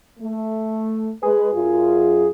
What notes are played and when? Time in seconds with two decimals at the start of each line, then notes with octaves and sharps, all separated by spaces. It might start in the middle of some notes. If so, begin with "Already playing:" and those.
0.19 A3
1.23 G#3 G#4 B4
1.53 F#2 F4